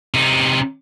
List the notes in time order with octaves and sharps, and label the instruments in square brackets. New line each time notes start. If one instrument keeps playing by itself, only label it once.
[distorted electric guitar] C3 D#4